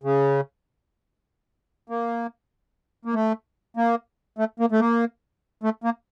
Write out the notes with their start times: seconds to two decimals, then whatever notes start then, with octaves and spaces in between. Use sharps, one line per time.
0.03 C#3
1.89 A#3
3.05 A#3
3.14 A3
3.77 A#3
4.38 A3
4.60 A#3
4.72 A3
4.80 A#3
5.63 A3
5.84 A#3